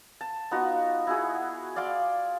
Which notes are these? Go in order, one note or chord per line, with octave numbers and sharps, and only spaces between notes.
A5
B3 D#4 F4 F#4
E4 F#4 G#4
D5 F5 C6 D6